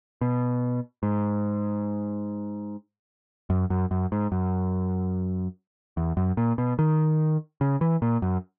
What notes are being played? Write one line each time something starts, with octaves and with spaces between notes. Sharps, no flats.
B2
G#2
F#2
F#2
F#2
G#2
F#2
E2
F#2
A#2
B2
D#3
C#3
E3
A#2
F#2